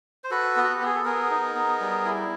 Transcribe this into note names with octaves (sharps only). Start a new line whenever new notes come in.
C5
F#4 A4 B4
B3
F#4
G4
B3 G#4
A4
B3 G#4 A#4
D#4
B3
G3
E4